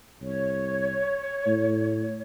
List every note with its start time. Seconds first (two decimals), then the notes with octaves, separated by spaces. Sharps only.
0.21 C2 C#5
1.47 A2